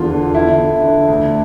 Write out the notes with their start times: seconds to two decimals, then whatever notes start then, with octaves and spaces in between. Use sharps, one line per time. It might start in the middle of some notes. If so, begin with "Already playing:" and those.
Already playing: E2 D3 F4
0.10 D3
0.35 D3 E4
0.60 D3
0.84 D3
1.08 D2